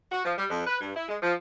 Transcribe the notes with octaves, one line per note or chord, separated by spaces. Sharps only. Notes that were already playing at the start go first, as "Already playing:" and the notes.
F#4
F3
G3
F2
B4
G2
E4
G#3
F3